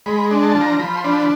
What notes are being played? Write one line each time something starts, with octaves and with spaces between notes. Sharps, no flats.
G#3 B5
D4
A5
F3
A#5
F3 B5
C6
D4 B5